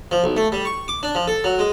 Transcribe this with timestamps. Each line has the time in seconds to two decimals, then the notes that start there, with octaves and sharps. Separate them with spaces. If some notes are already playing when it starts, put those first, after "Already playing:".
0.11 F3
0.24 B1
0.37 A3
0.52 G3
0.65 C#6
0.88 D6
1.03 D4
1.15 F3
1.27 A4
1.44 F#3
1.59 G#3